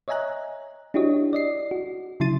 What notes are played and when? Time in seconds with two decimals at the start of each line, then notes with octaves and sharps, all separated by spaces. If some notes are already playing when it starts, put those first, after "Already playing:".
0.08 C#5 D#5 E5 G#5 A#5 F#6
0.94 D4 E4 F#4 G4 C#5 D#5
1.33 D5 D#5 C7
1.71 F#4
2.20 C#3 F#3 E4 C6 A6 D#7